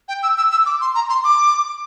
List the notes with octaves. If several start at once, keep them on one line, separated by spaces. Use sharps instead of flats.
G5
E6
E6
E6
D6
C6
A#5
C6
D6